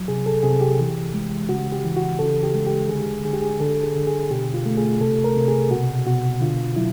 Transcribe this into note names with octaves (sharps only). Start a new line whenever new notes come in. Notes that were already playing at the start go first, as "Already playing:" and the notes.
Already playing: F#3
C3 G#4
A4
C3 G#4
G4
E3
G#3
C#3 F#4
G4
E3
F#4
C#3 A4
G4
G#3
G4
D3 G#4
D3 G#4
G4
G#4
D3 A4
G#4
D3
G#4
B2 G4
F4
A3
G#4
C3 A4
A#4
C3
G#4
B2 F#4
B2 F#4
D3 F4
F#3 E4